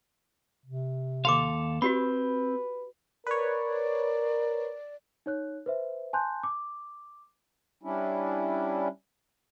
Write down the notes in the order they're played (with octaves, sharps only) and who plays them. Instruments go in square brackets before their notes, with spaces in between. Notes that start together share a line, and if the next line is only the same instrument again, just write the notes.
[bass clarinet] C3
[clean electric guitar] D#2 A4 F5 [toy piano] C6 D6
[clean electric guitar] C4 [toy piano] F#4 G4 B5 [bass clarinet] B4
[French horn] A#4 [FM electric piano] B4 C#5 [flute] D5
[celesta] D#4 C#5 F#6
B4 C5 E5
G#5 A5 C6 F#6 G6
D6
[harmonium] G3 C#4 D4 E4